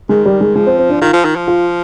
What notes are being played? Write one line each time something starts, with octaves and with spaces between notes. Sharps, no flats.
D#3 G#3
G3
G#3
F3 G#3
C4
C4
D4
D#3 F4
F3
D#3
F3
F4